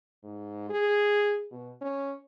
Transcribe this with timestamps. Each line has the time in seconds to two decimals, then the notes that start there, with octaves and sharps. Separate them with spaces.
0.23 G#2
0.70 G#4
1.51 B2
1.81 C#4